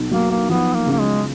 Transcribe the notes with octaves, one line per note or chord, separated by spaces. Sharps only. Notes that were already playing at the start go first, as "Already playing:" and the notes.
Already playing: B1
F#3 A#3
A#3
F3 B3
A#3
C#3
A#3
G#3